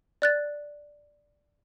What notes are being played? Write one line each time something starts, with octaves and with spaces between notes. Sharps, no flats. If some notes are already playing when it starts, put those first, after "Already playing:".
D5 F#6 A6